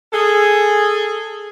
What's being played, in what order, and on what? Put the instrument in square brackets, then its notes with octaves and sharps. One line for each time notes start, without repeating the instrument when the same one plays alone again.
[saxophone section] G#4 A4